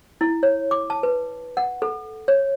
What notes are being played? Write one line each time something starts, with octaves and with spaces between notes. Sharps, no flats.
E4
C#5
D6
A5
B4
F#5
A4
C#5